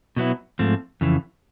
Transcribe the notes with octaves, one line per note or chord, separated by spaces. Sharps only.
B2 F#3 B3 E4
G#2 F3 A3 C4
F2 C#3 E3